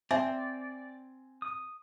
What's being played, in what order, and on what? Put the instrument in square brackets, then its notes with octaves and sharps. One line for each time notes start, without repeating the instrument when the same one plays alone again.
[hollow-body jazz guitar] C4 [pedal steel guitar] D5 [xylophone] E5 [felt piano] G#5
[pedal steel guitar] D#6